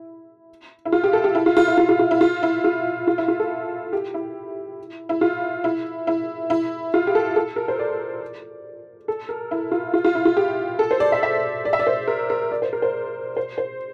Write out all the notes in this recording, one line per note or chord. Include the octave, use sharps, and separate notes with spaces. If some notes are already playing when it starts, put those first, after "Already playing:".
Already playing: E4
E4
F4
G4
A4
G4
E4
F4
F4
E4
F4
F4
F4
E4
F4
E4
F4
F4
E4
F4
A4
G4
E4
E4
F4
E4
E4
E4
F4
G4
A4
A4
A#4
C5
D5
A4
A#4
E4
F4
F4
F4
E4
F4
G4
A4
C5
D5
E5
E5
D5
E5
D5
C5
A#4
A#4
D5
C5
A#4
C5
C5
C5